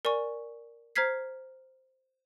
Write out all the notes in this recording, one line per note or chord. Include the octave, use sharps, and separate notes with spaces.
A#4 D5 G#5 C#6
C5 A#5 F6 G#6 B6 C7